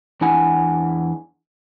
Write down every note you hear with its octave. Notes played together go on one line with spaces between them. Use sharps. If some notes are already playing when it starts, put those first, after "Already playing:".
E2 D4 E4 F#5 G#5